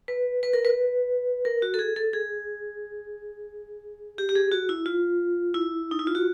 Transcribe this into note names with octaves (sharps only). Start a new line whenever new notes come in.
B4
B4
A#4
B4
A#4
F#4
A4
G#4
A4
G#4
G4
G4
G#4
F#4
E4
F4
E4
D#4
E4
F4
F#4